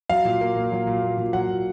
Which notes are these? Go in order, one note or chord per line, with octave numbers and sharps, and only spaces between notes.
F#3 F5
A#2
A#3
A#2
F#3
A#2
A#3
A#2
F#3 F#5
A#2